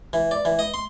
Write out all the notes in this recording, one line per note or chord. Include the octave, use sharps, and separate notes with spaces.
E3
D5
E3
D#5
C6